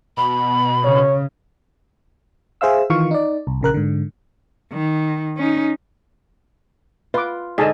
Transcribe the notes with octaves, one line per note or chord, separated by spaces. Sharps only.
B2 B5
C#3 C#5
G#4 C5 E5 F5 E6
D#3 E3 F4 F5 C#6
D#4 D5
C2
A#1 C#3 A#4 F#6
G#2 D3
D#3
C#4 D#4
F4 B4 D6
G#2 D3 D#5 G#5 A5